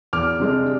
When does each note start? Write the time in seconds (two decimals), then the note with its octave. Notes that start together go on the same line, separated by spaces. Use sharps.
0.13 E2 D6 F6
0.40 C3 G#3 D4